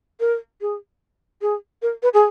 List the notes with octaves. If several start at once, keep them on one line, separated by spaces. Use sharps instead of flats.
A#4
G#4
G#4
A#4
B4
G#4